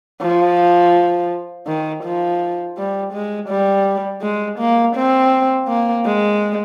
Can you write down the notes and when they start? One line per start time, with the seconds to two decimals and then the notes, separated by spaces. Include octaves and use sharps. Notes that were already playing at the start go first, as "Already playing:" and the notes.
0.22 F3
1.67 D#3
2.03 F3
2.78 G3
3.13 G#3
3.49 G3
4.22 G#3
4.59 A#3
4.96 C4
5.68 A#3
6.06 G#3